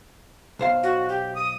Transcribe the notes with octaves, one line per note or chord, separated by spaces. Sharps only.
B1 C5 F5
F#4
G4
D#6